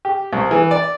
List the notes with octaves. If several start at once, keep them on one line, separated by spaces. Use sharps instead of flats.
G4
C2
E3
D5